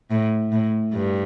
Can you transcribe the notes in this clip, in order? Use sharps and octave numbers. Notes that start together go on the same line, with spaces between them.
A2
A2
G2